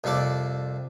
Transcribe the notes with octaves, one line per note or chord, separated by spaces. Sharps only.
C2 F2 C4 A4 D5